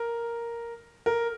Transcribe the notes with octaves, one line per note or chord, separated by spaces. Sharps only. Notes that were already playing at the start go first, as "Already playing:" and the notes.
Already playing: A#4
A#4